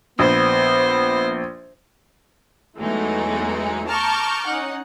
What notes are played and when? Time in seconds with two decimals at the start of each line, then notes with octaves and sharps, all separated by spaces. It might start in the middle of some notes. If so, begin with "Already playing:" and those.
0.19 A#1 B3 C5
2.78 E2 E3 F#3 G#3 A3 D#4
3.88 A5 A#5 C#6 D6 F6 G6
4.47 C#4 D#4 F#5